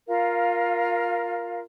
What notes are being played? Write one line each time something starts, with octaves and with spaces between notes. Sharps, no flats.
F4 A#4 F5